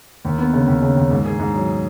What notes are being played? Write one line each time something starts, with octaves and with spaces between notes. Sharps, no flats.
D#2
B3
C#3
D#2
C#3
D#2
G#2
G#4
G#2
F#3